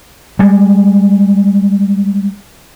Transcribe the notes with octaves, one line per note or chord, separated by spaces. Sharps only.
G3 G#3